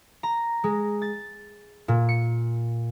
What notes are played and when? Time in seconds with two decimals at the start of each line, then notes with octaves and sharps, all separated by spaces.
0.23 A#5
0.64 G#3
1.02 A6
1.88 A#2
2.09 C#7